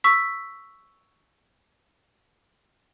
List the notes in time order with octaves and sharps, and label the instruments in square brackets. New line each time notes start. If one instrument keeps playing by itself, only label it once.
[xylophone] C#6 E6 B6